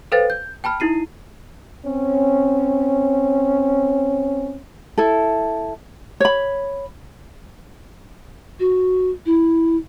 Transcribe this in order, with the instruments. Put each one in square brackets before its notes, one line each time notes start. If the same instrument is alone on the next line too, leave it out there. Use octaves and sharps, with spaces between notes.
[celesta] A4 B4 C5 F5 G5 A6
G6
G5 A5 B5 F6
D#4 E4 C7 D#7
[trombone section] C4 C#4
[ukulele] E4 A4
C#5 B5
[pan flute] F#4
E4